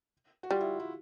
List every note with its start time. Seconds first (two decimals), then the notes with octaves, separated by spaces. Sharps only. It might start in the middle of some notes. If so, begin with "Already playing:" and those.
0.43 F#4
0.51 G3 F4
0.60 E4
0.80 E4